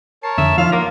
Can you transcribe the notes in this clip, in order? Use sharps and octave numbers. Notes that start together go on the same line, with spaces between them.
A#4 C#5 A5 C7
F2 D3 E5 D#6
F3 D#4 F4 C#5 F5
A#3 F#5 D6 A#6